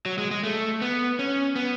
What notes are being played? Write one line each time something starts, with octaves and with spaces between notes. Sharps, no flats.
F#3
G#3
G#3
A3
B3
C#4
B3